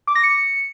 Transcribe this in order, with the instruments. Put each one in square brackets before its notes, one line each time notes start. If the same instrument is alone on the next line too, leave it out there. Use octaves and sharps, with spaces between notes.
[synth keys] D6
A#6
C#7